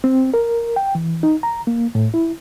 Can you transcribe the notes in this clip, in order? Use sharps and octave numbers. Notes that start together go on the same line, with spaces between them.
C4
A#4
G5
E3
D#4
A#5
A#3
A2
E4